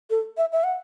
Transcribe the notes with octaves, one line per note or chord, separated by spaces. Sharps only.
A4
E5
E5
F#5